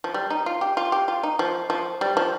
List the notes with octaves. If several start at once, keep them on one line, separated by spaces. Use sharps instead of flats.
F3
G3
D#4
F4
G4
F4
G4
F4
D#4
F3
F3
G3
F3